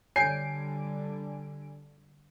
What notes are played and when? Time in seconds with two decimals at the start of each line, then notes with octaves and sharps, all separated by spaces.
0.16 D3 G3 C#5 G#5 C7 D7